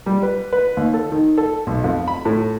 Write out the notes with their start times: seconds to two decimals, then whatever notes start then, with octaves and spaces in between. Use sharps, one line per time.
0.06 G3
0.23 B4
0.53 B4
0.77 D#2
0.94 A4
1.12 D#3
1.38 A4
1.67 B1
1.84 F2
2.08 B5
2.25 A2